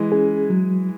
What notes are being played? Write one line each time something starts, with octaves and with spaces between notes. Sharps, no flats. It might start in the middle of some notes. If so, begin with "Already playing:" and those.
Already playing: E3 G#3
C#4 G#4
F#3